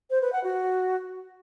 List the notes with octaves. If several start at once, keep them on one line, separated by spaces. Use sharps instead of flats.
C5
B4
F#5
F#4